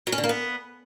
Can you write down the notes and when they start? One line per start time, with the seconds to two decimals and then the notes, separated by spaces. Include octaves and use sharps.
0.07 F#3
0.12 C#4
0.18 D3
0.24 A#3
0.29 B3